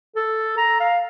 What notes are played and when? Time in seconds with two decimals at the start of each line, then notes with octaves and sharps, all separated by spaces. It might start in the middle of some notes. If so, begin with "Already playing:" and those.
0.16 A4
0.57 A#5
0.80 F5